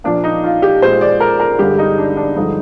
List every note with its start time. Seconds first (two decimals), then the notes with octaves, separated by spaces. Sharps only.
0.04 A#2 F3 A#3 D4
0.24 D#4
0.44 F4
0.62 G4
0.82 A#2 G#3 C5
1.01 D5
1.20 A#4
1.40 A#4
1.59 G2 D3 G#3 G4
1.78 D#4
1.98 D4
2.17 D4
2.36 G2 D3 F3 G#3 D#4